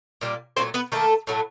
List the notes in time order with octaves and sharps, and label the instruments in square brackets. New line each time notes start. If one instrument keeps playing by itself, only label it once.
[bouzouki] A#2 G3 A#3
A#2 F#3 A3 C4 C5
B3 B4
D#3 G3 A3 A#3 A4
A2 F#3 A3